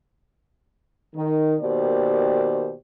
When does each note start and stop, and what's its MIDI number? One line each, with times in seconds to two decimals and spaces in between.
1.15 1.55 51
1.61 2.73 47
1.61 2.73 51
1.61 2.73 58
1.61 2.73 67
1.61 2.73 72
1.61 2.73 74